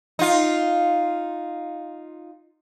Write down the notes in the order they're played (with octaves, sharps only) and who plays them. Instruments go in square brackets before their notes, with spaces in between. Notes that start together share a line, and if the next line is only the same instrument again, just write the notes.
[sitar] D#4 F4